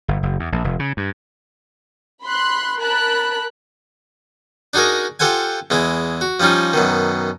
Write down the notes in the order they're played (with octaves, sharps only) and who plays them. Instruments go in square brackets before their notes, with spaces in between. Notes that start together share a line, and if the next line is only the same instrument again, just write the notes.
[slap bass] G1
F#1
E2
A#1
F1
C#3
G2
[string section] B5 C6 F#6
A#4 A5 B5 F#6
[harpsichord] D4 D#4 F#4 G#4 A#4
F4 G4 A4 C5 F#5 G#5
E2 G#3 E4
F#4
F3 G3 C#4 D#4 F4
F#2 B2 D#3